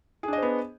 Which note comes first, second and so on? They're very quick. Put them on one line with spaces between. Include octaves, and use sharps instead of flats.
G#4 D4 D#5 C5 B3